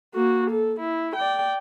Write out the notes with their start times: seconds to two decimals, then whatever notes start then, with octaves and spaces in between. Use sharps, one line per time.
0.15 A#3 F#4
0.51 A4
0.80 E4
1.16 D5 G5